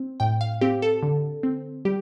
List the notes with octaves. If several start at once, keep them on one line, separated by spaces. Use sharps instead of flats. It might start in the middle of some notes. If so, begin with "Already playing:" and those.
Already playing: C4
A2 G5
F5
C4 G4
A4
D3
C4
G3 G4